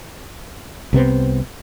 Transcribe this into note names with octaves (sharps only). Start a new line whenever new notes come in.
C2 C3 B3 C4